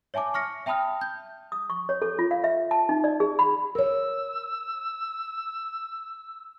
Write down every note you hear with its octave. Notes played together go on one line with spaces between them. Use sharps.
C#5 E5 G#5 A5 D6
C#6 F6 A#6 C#7
E5 G5 A5 B5 D#6 F6
G6
D#6
C#6
C#5
A4
F4
F5
E5
A5
D#4
D5
G#4
B5
A#4 C#5 E6